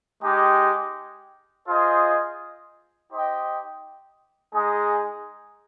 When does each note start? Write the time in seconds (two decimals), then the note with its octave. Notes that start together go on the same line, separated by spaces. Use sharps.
0.23 G#3 D#4 G4
1.67 F4 G#4 C5 D#5
3.11 D#4 G4 C5 D#5 G5
4.54 G#3 D#4 G#4